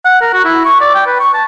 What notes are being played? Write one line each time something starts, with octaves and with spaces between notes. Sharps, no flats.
F#5
A#4
F#4
E4
C#6
D5
G5
B4
C#6
A5